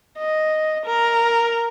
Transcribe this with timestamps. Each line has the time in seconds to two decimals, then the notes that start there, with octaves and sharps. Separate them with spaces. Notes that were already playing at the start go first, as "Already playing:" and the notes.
0.18 D#5
0.85 A#4